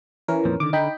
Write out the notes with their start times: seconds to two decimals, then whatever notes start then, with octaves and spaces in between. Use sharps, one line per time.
0.28 E3 C#4 A#4
0.45 F2 A#2 F3
0.60 D3 D#3 D6
0.73 D3 D#4 G5 B5